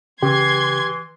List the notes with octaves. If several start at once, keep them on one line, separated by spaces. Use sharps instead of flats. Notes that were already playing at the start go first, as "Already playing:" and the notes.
C#3 E3 G4 C6 G#6